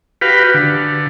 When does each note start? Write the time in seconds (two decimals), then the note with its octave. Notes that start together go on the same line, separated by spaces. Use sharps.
0.21 F#4 G4 B4 F5
0.54 D3